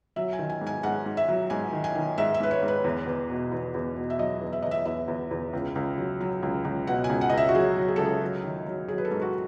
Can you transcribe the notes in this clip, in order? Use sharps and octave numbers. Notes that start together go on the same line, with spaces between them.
F#3 E5
G#5
D#3
G#5
G#2
G#5
G#2 F#5
G#2
E5
F#3
G#2 G#5
D#3
G#5
D#3
G#2 E5
E5
G#2 B4
C#5
G#2
B4
E2
E2
B2
E2
E2
B2
E5
F#3 D#5
E2
E5
E2 D#5
E5
E2 E5
E2
E2
C#2
C#2
F#3
F#3
C#2
C#2
B2 F#5
G#5
C#2
F#5
D#5
C#2 E5
F#4
F#3 G#4
F#3
G#4
C#2 A4
G#4
F#3
D#3
F#3
F#3 G#4
B4
A4
G#2
F#4